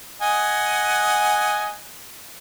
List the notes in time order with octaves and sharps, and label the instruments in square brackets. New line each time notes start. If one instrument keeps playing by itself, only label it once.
[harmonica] D#5 F#5 G#5